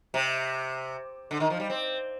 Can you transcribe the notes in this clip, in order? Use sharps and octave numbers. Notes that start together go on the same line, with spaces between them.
C3
D3
D#3
F3
G3
C4